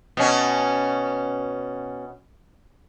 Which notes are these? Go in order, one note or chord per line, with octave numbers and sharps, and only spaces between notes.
B2 C#4